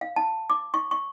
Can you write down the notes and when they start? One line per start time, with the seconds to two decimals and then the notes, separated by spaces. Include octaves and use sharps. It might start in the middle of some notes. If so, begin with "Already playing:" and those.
0.01 F5
0.16 A5
0.50 D6
0.74 C#6
0.91 C#6